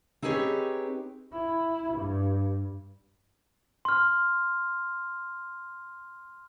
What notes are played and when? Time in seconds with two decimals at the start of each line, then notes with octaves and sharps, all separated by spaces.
0.22 C4 D#4 G4 G#4 B4 C#5
1.32 E4
1.93 G2
3.85 C6 F6